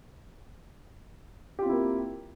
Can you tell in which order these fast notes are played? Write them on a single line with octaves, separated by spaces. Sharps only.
G4 F4 C4 E4 A#3